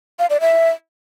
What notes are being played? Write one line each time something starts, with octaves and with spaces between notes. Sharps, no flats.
F5
D5
E5